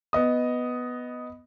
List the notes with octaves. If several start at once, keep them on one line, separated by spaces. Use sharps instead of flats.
B3 D#5 D#6